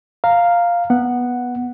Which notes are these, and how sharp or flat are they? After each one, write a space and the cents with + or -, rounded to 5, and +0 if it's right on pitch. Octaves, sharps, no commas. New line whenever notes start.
F5 +0 A#5 -10
B3 -10 F#5 +0